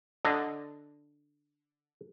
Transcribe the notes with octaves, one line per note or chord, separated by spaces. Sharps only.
D3 D4 D#5